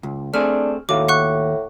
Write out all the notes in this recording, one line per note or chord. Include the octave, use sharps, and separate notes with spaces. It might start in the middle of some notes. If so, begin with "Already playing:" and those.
C#2
A3 C4 D4 G#4 F6
D#2 A2 F#4 F5 D6
F#5 C#6 F#6